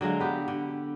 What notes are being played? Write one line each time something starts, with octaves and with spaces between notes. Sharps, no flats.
D3 F#3 G#3 F5
B3 G4
D3